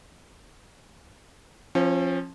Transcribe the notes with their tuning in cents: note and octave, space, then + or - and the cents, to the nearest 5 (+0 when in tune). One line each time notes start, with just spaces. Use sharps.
F3 +0 C#4 -35